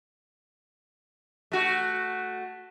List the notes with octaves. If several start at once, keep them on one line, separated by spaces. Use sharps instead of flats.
A3 F#4